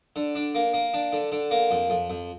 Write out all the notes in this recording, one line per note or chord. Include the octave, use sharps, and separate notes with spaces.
D3
D4
A#3
A#3
D4
D3
D3
A#3
F2
F2
F2